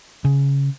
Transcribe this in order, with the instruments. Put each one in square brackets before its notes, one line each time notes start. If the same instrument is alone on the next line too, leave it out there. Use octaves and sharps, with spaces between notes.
[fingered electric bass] C#3